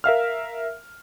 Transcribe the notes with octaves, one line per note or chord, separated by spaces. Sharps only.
A#4 E5 F5 F6